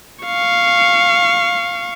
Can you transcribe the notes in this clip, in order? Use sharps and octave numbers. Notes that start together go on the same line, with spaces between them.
F5 C#6